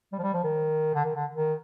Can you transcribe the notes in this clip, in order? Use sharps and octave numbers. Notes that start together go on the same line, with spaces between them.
G3
F3
G3
F3
D#3
D3
D#3
D3
D#3